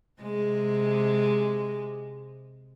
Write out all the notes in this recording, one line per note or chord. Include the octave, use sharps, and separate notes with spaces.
C3 G#3